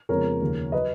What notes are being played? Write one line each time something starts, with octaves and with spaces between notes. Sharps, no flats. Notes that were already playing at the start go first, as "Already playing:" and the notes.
F2 C#3 G#3 B3 A#4 C#5
D#2 C#3 F3
F#3 B4 D#5